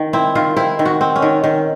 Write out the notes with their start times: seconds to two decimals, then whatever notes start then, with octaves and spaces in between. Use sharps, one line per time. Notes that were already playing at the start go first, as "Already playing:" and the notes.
Already playing: D#3
0.13 C4 E4
0.35 D#3 F4
0.57 C4 E4
0.79 D#3
0.85 F#4
1.01 C4
1.16 C#4
1.22 D#3
1.44 D#3